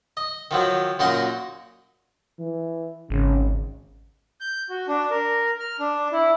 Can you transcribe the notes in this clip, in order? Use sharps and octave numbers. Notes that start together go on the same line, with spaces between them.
D#5
D#3 F3 F#3
F#2 A#2 D#4 F#4 A#4 C6
E3
G#1 C#3
G6
F#4
D4
A#4
F6
D4
E4